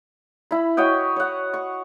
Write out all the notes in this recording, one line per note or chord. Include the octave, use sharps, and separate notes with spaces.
E4 B5
F#4 C#5 D#5 G5
C#5 F#5
C#6